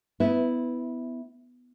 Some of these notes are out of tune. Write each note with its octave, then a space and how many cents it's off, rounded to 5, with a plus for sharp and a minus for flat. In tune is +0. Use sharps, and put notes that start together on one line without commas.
B3 +15 E4 -10